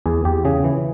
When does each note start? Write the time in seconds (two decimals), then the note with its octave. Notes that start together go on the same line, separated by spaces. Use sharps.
0.06 E2 G#4
0.25 E2 G4
0.45 C#3 G#4
0.64 E3